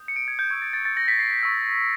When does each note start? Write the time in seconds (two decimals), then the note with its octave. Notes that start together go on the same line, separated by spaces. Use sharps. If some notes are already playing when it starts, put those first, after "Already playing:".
Already playing: D#6 G6
0.08 C#7
0.16 D7
0.28 G#6
0.39 G6
0.50 C#6 E6 G6 G#6
0.62 A6
0.73 A6
0.85 A6
0.97 A#6
1.08 B6
1.19 C7
1.42 C#6 E6 G6